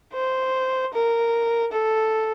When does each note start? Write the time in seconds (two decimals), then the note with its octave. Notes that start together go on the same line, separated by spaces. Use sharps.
0.13 C5
0.93 A#4
1.72 A4